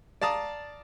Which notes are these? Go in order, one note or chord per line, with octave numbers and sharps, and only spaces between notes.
D5 F5 A5 A#5 D#6